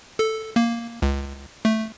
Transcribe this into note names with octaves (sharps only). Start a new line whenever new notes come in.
A4
A#3
C#2
A3